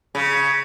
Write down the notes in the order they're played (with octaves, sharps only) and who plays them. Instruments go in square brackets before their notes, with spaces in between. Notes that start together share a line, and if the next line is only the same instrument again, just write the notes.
[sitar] C#3